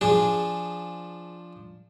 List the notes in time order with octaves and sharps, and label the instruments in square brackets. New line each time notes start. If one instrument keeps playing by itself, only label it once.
[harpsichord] F3 D4 [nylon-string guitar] G#4